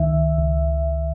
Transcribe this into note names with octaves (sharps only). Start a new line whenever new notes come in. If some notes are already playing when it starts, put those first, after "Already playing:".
Already playing: C#2 D#3 E5
C#2